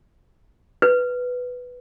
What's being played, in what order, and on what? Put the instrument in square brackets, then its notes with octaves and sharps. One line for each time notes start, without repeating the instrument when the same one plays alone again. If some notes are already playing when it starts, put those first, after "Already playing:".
[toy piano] B4